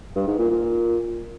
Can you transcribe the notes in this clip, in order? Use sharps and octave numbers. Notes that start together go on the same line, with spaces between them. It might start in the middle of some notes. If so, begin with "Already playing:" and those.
G2
G#2
A#2
A#2